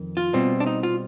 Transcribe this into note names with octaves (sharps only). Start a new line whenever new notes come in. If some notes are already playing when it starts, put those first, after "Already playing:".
Already playing: F2 D#3
F4
B2 G3 C4
D4
D#4
F4